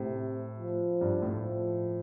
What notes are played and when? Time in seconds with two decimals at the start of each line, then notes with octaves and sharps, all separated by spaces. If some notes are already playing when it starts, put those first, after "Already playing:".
Already playing: A2 C3
0.59 F3
1.01 G2
1.22 A2
1.43 F3